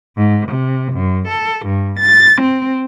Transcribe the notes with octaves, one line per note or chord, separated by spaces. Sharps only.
G#2
C3
F#2
A4
G2
A6
C4